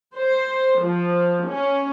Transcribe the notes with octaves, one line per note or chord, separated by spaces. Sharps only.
C5
F3
C#4